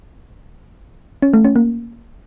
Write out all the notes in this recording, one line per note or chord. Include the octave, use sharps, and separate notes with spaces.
C#4
A3
C#4
A#3